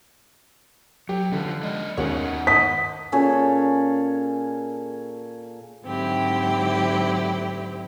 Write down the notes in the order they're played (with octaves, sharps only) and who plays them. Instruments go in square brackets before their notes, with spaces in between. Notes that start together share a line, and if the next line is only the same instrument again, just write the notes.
[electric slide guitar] F#3 [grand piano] G4
[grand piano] D3 [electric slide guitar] E3 F3
[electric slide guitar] G#3 D5 D#5
[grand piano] D#2 G#3 C#4 [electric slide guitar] D#3 B3 C#5 [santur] F#5
[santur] D#5 [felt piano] B6
[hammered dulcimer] A#2 C#4 G#4 A4
[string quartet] G#2 D3 F#3 C4 E4 G4